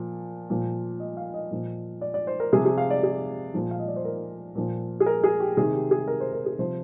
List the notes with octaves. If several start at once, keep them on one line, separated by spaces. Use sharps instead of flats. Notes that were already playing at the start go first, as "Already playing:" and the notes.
Already playing: A#2 F3
A#2 F3
D#5
F5
D#5
A#2 F3
D5
D5
C5
A#4
C3 F3 G#4
G#4
F5
D5
G#4
A#2 F3
F5
D#5
D5
C5
A#4
A#2 F3
G#4
A#4
G#4
G4
C3 D#3 G#4
G4
G#4
A#4
C5
A#4
G#4
C3 F3 C5